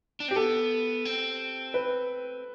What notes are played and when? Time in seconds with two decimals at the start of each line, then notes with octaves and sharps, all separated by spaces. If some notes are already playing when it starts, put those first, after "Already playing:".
0.20 D4
0.28 C4 G4
0.36 B3 A4
1.05 C4
1.74 B4